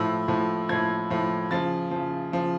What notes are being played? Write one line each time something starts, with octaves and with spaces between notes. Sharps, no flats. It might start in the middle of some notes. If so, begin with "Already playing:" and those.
Already playing: A2 F3 E6
A2 F3
A2 F3 G#6
A2 F3
C#3 F3 A6
C#3 F3
C#3 F3